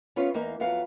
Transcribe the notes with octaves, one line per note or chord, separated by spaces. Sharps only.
B3 C#4 F4 C#5
E2 A#3 D#4
F2 F#3 B3 F5